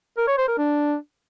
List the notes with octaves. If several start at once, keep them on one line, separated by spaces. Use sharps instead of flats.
A#4
C#5
C5
A#4
D4